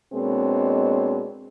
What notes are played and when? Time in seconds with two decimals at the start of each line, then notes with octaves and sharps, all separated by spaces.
0.13 B2 G#3 A#3 C4 D4 C#5